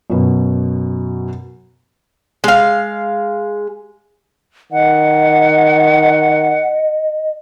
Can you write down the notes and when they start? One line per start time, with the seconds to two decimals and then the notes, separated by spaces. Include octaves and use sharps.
0.10 F#2 B2
2.44 G#3 F5
4.72 D#3 D#5 F#5